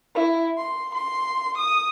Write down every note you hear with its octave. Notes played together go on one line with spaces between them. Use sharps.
E4
C6
C6
D#6